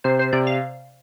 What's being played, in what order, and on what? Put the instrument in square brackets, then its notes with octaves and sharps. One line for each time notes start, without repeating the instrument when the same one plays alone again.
[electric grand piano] C3 [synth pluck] C5
[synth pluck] C5
[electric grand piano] C3 [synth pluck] D5
[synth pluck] F5